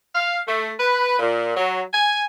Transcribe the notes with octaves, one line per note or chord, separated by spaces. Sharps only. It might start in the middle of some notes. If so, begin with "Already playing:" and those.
F5
A3
B4
A#2
F#3
G#5